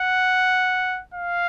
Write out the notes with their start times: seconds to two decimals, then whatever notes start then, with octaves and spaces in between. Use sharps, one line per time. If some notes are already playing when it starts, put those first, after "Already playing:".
Already playing: F#5
1.14 F5